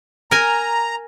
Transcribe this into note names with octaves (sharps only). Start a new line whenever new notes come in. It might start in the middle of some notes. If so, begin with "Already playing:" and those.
A#4 G#5 A#5